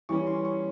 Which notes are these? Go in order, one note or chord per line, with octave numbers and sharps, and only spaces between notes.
E3 G3 C#4 C#6
C6
C#6